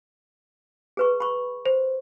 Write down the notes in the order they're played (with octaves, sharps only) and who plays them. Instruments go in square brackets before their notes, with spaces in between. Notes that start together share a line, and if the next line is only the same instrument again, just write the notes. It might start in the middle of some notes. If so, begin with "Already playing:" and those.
[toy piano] G#4 B4 C#6
B5 C#6
[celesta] C5